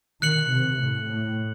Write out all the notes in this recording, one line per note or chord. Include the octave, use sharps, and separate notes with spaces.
D#3 F#6 C#7 F#7
C3
A2
A2